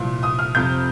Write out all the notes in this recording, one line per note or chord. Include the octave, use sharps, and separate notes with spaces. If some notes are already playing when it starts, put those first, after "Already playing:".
Already playing: C2 A#2 F3
D#6
F6
F2 C3 F3 G6